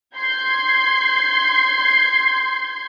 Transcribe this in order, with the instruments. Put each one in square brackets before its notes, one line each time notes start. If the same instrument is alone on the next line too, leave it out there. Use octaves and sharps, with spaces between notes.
[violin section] C6 G6 G#6 C7